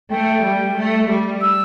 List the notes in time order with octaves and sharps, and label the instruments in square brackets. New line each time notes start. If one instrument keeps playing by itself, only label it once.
[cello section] A3 [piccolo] G5
[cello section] G3
A3
G3
[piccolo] E6